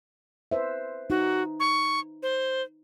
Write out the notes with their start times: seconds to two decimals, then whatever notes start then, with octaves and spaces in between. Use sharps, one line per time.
0.51 B4 C5 E5
1.10 D#4 F#4
1.60 C#6
2.23 C5